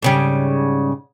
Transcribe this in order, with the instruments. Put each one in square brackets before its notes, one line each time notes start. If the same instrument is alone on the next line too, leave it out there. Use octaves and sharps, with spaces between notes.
[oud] G#2 C#3 G3